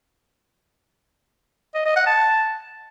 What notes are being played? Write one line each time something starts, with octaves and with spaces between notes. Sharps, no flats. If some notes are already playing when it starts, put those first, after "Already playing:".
D#5
D#5
F#5
A5